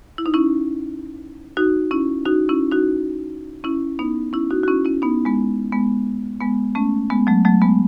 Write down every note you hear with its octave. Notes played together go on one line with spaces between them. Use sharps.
E4
D#4
C#4 E4
D#4 F#4
C#4 E4
D#4 F#4
C#4 E4
D#4 F#4
C#4 E4
B3 D#4
C#4 E4
D#4 F#4
F#4
C#4 E4
C#4 E4
B3 D#4
G#3 B3
G#3 B3
G#3 B3
A3 C#4
G#3 B3
F#3 A3
F#3 A3
G#3 B3